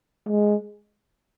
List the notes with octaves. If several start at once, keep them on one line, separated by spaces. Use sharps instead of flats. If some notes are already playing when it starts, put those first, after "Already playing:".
G#3